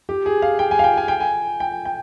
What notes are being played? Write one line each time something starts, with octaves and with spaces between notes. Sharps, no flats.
G4
G#4
F5
G5
G#5
F5
G5
G#5
G5
G#5
G5
G5